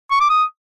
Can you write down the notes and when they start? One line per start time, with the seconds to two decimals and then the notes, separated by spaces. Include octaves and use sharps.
0.11 C#6
0.20 D6
0.29 D#6